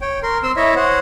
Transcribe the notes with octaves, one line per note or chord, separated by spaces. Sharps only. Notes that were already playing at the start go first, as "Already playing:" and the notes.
C#5 G5
A#4 C6
C4 C6 E6
E4 C#5 D#5 E5
C5 C#5 F#5